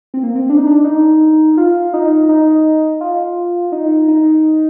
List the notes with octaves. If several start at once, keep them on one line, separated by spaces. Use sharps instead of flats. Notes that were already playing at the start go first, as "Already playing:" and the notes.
C4
A#3
C4
D4
D#4
D4
D#4
F4
D#4
D#4
F4
D#4
D#4